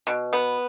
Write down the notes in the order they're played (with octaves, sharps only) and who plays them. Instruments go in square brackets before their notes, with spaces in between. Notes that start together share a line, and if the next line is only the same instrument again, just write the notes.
[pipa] B2
B3